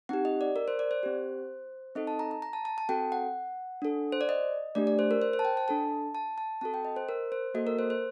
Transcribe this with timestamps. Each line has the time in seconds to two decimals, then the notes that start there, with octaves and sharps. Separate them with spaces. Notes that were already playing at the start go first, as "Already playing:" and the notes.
0.09 C4 D#4 G4 F#5
0.25 D#5
0.41 D5
0.56 A#4
0.68 C5
0.79 D5
0.91 C5
1.03 C4 G4
1.95 C4 D#4 A4 D#5
2.07 A5
2.19 A#5
2.31 A#5
2.42 A#5
2.53 A5
2.65 A5
2.78 A5
2.89 C4 F#4 A4 G5
3.12 F#5
3.82 D4 A4
4.12 C5
4.21 D5
4.29 D#5
4.75 A3 D4 G4 D5
4.87 D5
4.99 C5
5.11 A#4
5.22 C5
5.33 C5
5.39 A5
5.45 G5
5.57 A5
5.68 D4 A4 A5
6.15 A5
6.38 A5
6.61 C4 F#4 A4 A5
6.74 G5
6.85 D#5
6.96 C5
7.09 A#4
7.32 C5
7.54 A#3 F#4 A4 D#5
7.67 A#4
7.79 C5
7.90 C5